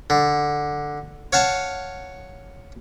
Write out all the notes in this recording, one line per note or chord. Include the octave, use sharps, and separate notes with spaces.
D3
C#5 F5 F#5 A5